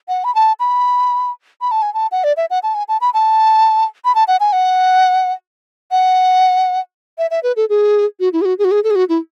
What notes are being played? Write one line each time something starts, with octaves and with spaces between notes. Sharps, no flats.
F#5
B5
A5
B5
B5
A5
G#5
A5
F#5
D5
E5
F#5
A5
G#5
A5
B5
A5
B5
A5
F#5
G#5
F#5
F#5
E5
E5
B4
A4
G#4
F#4
E4
G#4
F#4
G#4
F#4
G#4
A4
G#4
F#4
E4